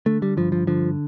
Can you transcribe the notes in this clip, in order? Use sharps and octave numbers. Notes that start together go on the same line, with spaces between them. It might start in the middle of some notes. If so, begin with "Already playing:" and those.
D3 A3
G3
G2 F3
F3
D3 F3